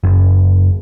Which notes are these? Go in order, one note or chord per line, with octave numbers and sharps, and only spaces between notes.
F#1